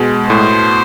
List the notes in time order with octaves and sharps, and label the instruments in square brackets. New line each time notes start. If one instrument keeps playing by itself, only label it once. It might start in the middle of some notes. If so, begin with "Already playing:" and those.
Already playing: [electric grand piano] B2 G#3
[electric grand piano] A2 [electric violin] C5